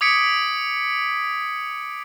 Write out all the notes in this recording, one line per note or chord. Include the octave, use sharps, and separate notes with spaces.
D6 D#6 G#6 B6 C#7 D7